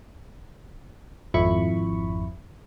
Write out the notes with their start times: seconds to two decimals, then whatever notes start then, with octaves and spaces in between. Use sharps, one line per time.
1.34 G#1 F2 E4 B5 C#6